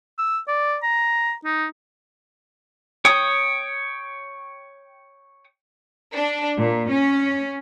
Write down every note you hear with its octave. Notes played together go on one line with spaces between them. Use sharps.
E6
D5
A#5
D#4
C#5 G5 D#6
D4
A#2
C#4